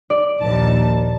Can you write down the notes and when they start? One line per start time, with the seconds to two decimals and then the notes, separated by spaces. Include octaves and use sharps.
0.10 D5
0.41 A#1 D#2 A5